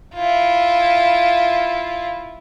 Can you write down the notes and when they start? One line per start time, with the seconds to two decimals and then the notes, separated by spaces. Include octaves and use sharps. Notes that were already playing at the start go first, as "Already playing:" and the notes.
0.15 E4 F4